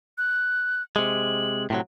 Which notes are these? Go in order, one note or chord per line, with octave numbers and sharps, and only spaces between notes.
F#6
C3 G#3 F#7
A2 C3 F#3